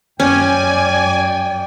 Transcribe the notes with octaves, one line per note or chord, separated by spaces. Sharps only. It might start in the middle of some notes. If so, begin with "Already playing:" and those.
F#2 C#4 D5 G5 G#5